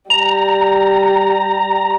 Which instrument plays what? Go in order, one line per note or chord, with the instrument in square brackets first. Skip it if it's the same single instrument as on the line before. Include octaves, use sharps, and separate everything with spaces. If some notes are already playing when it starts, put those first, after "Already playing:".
[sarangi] G3 [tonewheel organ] A#5